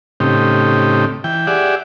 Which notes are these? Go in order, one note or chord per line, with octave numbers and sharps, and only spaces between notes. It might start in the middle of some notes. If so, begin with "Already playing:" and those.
A2 C#3 C4 D#4 G4
E3 G5
G4 G#4 D5 E5 F#5